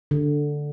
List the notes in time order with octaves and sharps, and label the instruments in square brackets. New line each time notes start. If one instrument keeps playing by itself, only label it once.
[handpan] D3